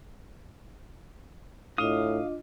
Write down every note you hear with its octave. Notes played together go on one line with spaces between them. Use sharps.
A2 D4 F4 D#5 F5 D#6